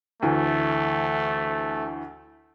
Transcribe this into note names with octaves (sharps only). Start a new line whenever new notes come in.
D2 E3 A3